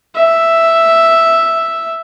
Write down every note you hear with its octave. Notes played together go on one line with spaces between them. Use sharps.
E5